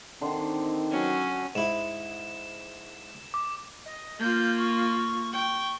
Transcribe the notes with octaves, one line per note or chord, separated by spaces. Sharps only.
D3 D#3 C4 C6
F#3 C#4
G#2 E4 E7
D6
D#5
A#3 F4 G6
C#6
G5 C#6